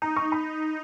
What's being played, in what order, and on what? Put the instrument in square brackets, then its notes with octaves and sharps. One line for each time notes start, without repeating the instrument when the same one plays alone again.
[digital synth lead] D#4 [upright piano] A#5
[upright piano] C#6
B5